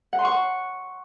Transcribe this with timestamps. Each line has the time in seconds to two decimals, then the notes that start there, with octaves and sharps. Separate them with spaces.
0.13 F#5
0.19 C6
0.25 C#6